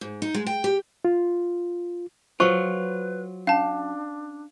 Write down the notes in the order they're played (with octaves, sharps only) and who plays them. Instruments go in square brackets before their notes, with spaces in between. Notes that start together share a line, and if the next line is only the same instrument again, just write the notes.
[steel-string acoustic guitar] G#2
D#4
G#3
G5
G4
[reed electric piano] F4
[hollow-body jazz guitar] F#3 F4 [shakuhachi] B4 [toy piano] C5 C#6
[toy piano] C#4 [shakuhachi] D4 [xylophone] F5 A5